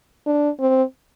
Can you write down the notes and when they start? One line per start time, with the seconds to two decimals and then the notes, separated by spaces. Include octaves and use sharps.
0.26 D4
0.60 C4